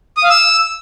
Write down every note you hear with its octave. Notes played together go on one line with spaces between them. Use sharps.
D#6
F5
E6